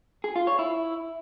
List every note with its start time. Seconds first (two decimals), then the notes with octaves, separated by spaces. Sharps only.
0.24 G#4
0.36 F4
0.47 C#5
0.59 E4